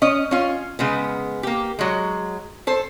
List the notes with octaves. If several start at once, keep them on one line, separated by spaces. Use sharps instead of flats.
C#4 D#5
C#4 F4
C#3 G#3 B3
A#3 G4
F#3 G#3
A4 C5